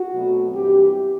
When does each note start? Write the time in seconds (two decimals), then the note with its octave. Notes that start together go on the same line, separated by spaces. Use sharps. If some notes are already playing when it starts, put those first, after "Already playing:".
Already playing: F#4
0.13 B2 F#3 A3 C4
0.54 G2 E3 G3 C4 G4